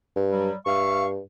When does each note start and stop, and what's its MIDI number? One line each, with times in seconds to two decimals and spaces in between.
0.16 0.49 43
0.30 0.55 54
0.30 0.55 55
0.66 1.20 43
0.66 1.06 76
0.66 1.06 77
0.66 1.06 85